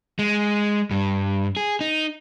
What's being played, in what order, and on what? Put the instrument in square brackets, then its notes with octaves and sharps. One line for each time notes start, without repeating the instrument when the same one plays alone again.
[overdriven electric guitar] G#3
G2
G#4
D#4